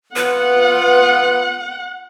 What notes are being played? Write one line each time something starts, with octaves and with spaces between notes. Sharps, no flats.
B3 F4 B4 F#5